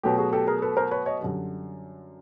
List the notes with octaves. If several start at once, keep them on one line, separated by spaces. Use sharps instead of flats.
B2 F#3 A3 G4
F#4 G#4
G4 A4
G#4 A#4
A4 B4
A#4 C5
B4 C#5
C#5 D#5
F#2 D3 G3